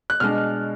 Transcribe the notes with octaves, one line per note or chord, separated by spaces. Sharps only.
F#6
B2 G#3 D4 F6